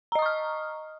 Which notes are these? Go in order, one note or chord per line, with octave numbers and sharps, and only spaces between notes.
D#5 A#5 C#6 D#6 F6